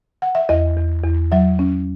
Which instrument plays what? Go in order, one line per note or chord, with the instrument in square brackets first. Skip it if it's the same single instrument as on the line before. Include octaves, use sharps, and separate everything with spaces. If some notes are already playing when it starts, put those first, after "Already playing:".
[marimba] F#5
E5
E2 D#5
E2
E2
F#3 E5
C#4